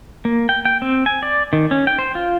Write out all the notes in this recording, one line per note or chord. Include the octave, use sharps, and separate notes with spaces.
A#3
G5
G5
C4
G#5
D5
D#3
C#4
G5
C5
F4